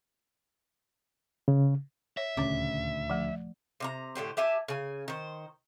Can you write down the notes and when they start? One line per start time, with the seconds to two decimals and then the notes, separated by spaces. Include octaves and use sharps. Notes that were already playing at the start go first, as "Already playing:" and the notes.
1.48 C#3
2.17 C#5 E5
2.37 D#1 D2 C#3 C#4 C#5 D6
3.10 F3 A3
3.80 C3 G4 A#5
4.15 A2 D3 G4 C5
4.37 G4 E5 G#5 A5
4.68 C#3 G#5
5.08 D#3 C5